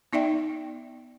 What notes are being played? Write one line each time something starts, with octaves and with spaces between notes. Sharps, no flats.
B3 D#4 D5 E5 G5